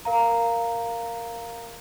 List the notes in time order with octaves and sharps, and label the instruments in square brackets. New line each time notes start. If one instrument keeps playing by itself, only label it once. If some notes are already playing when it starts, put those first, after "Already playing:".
[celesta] A#4 F5 A#5